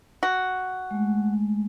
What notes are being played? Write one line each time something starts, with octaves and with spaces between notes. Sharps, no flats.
F#4
G#3 A3